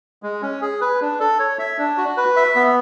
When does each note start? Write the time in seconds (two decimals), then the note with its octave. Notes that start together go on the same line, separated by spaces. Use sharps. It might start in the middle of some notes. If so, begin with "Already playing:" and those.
0.23 G#3
0.42 C#4
0.62 G#4
0.81 B4
1.01 D4
1.20 A4
1.39 C#5
1.59 E5
1.79 D4
1.98 F#4
2.17 B4
2.36 E5
2.56 B3